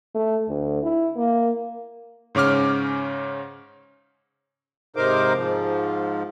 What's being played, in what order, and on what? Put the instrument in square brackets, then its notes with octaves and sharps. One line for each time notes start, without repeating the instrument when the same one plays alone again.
[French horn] A3
D2
E4
A#3
[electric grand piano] G#2 C#3 C#4 D6 F6
[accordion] G#2 C3 D#4 A#4 C5 D6
G#2 F3